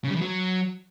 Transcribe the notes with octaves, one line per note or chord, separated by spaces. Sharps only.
C#3
G3
E3
F#3